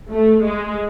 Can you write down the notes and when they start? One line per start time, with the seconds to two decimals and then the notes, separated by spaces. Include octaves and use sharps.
0.10 A3
0.42 G#3